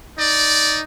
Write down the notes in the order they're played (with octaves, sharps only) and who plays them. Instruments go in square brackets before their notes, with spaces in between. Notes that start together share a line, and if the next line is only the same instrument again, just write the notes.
[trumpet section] D#4 D5